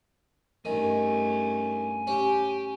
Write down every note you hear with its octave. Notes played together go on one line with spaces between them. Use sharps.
G2 D#3 A3 C#4 G#5
C#4 G4